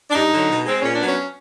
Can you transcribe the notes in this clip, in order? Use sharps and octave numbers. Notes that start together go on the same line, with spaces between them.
D4
G2 D#4
D3 F#3
B2
G#3 C4
A#2 C#4
F#3 B3 D4
C#4